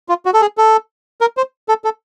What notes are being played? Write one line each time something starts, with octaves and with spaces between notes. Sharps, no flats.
F4
F#4
A4
G#4
A4
A#4
C5
A4
A4